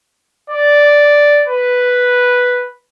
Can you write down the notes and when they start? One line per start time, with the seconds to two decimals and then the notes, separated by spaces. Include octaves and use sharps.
0.50 D5
1.48 B4